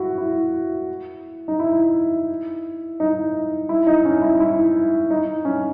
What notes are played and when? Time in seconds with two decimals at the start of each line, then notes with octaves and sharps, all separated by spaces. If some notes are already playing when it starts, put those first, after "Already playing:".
Already playing: E4 F#4
0.18 E4
1.48 D#4
1.59 E4
3.00 D#4
3.69 E4
3.87 D#4
4.05 C#4
4.22 E4
4.40 E4
5.11 D#4
5.45 C#4